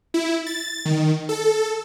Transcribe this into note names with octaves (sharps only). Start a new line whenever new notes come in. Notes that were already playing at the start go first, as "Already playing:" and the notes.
E4
A6
D#3
A4